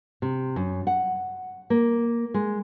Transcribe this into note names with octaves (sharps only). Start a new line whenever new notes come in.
C3
F#2
F#5
A#3
G#3